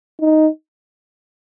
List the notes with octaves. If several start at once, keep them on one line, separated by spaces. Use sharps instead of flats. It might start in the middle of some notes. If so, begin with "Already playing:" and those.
D#4